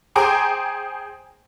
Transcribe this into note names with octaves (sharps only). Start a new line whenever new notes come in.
G#4 C5 G5 G#5 A#5 D6